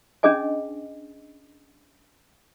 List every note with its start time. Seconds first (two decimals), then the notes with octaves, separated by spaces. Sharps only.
0.23 C#4 D4 G#4 D#5 G#5